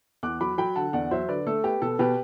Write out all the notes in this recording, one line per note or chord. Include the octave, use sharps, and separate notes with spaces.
E2 D6 F#6
F#3 B5 D6
F#3 G5 B5
D3 F#5 A5
E2 D5 F#5
F#3 C5 E5
D3 B4 D5
A3 A4
B3 G4
B2 A4
B2 G4 B4